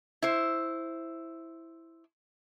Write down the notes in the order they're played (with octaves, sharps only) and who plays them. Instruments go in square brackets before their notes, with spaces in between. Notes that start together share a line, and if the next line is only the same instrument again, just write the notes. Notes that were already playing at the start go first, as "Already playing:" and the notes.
[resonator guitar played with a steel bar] E4 C5